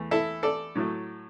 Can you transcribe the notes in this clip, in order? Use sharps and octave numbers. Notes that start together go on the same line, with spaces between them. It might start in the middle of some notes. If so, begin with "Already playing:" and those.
Already playing: E2 E3 A3
E4 A4
A4 D5
A2 F#3 A3